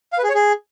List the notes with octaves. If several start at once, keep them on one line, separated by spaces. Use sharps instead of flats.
F5
B4
G#4
C#5
G#4